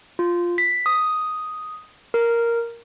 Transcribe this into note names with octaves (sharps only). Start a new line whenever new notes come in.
F4
B6
D#6
A#4